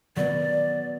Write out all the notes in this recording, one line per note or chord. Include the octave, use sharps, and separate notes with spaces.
F#3 B3 D5